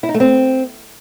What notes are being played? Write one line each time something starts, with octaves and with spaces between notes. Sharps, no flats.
E4
D#4
A3
C4